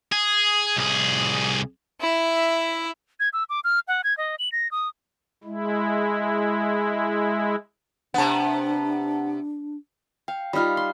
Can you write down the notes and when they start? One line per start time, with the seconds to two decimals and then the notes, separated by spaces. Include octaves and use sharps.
0.12 G#4
0.77 C2 G#4
2.00 E4 E5
3.20 G#6
3.33 E6
3.50 D6
3.64 F6
3.88 F#5
4.04 G#6
4.18 D#5
4.39 F#7
4.52 A#6
4.71 D#6
5.44 G#3 E4
8.14 C3 B3 D4 F#5 A5
10.28 F5 G5
10.53 G3 D#4 F4 B5 F6
10.77 C6